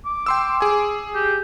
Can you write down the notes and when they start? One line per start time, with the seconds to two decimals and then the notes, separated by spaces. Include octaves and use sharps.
0.06 D6
0.26 G5 C6 E6
0.61 G#4 G#5
1.15 G4